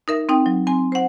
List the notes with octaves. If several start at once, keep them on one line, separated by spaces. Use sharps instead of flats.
D#4 A#4 E5
C4 D#4 G5
F#3
C4 G#5 C6
C5 F#5